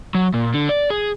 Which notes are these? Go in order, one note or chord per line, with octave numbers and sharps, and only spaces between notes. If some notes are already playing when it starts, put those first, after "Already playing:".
F#3
A#2
D3
D5
G#4